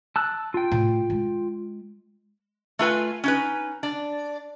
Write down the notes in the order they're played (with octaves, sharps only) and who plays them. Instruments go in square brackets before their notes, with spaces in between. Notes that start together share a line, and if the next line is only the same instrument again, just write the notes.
[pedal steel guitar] A5 E6 F#6
F4 G5
[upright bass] A2
G#3
[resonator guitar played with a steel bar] A3 F4 B4 G#5
C#4 D#4 B4
D4 D5